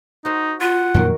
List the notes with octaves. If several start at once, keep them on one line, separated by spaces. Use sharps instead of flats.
D#4 F#4 C5
F4 F#5
F2 A#2 D#3 F#3 F#4 A#4